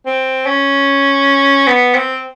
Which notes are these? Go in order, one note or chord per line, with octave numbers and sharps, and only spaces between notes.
C4
C#4
B3
C4